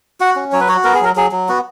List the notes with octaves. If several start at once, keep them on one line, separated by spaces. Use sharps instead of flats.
F#4 F#5
C#4
F#3 C#5
B4
F#4 C#5
B3 A#4
G#4
F#3 A#4
F#3 G#4
F#3
B3 F#4